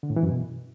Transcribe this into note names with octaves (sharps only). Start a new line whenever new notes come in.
D3
A2
E3
F#2
B2